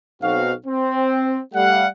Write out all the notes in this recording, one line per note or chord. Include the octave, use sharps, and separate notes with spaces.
B1 C4 F#4 F5
C4
G3 A3 F5 F#5